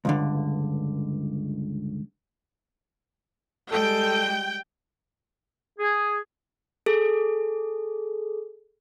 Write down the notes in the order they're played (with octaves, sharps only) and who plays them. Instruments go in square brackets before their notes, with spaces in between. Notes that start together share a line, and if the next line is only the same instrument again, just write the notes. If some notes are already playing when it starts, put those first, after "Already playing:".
[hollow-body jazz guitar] C#2 G2 D3
[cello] G3 G#3 [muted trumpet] A4 [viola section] G5
[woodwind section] G#4
[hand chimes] G#4 A4